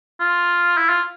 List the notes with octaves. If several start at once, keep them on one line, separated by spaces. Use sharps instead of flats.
F4
E4
F4